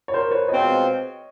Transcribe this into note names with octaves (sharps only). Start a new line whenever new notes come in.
C#5
A#4 C5
B4 C#5
B2 G#3 C4 F4 C#5 D#5